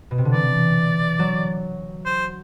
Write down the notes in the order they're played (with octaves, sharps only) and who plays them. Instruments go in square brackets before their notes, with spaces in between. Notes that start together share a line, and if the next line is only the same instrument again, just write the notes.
[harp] B2
C3
D3
[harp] E3 [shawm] D5
[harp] F#3
[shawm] C5